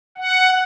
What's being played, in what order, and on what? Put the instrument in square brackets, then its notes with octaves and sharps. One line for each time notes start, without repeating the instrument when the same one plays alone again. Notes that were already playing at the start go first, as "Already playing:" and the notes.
[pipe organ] F#5